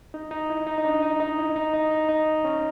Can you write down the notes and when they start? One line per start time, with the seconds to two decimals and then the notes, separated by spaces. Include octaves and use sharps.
0.14 D#4
0.31 D#4
0.50 E4
0.67 D#4
0.78 D#4
0.85 D4
1.03 D#4
1.20 D#4
1.38 E4
1.56 D#4
1.73 D#4
1.91 D#4
2.09 D#4
2.45 C#4